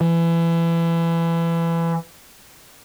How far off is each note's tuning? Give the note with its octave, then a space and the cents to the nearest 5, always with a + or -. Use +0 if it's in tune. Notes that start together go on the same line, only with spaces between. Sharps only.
E3 +25